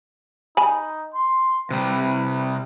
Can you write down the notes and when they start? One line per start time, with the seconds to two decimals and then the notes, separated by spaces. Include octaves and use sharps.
0.57 D#4 G#5 B5
1.14 C6
1.71 C3 G3 B4